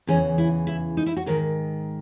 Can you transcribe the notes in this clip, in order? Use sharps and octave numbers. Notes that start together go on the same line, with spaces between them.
E2 C#3 E3 C#4
E4
E4
D#4
E4
F#4
G#2 D#3 A#4